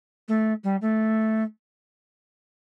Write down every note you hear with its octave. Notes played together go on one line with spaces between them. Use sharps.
A3
G3
A3